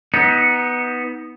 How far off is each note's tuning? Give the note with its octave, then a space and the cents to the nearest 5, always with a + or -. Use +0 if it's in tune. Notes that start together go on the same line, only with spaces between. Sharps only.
B3 +0 D#4 +25